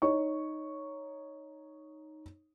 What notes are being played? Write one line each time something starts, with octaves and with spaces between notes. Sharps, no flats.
D#4 C#5 C#6